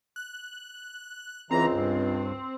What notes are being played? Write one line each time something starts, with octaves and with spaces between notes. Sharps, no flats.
F#6
C#2 E3 C4 A#5
G2